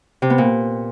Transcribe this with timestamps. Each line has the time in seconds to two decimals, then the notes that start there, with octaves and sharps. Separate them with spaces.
0.22 C3
0.30 B3
0.38 A#2